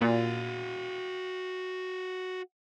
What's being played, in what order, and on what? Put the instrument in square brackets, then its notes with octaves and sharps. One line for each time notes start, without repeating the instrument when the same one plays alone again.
[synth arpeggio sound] A#2 [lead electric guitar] F#4 F5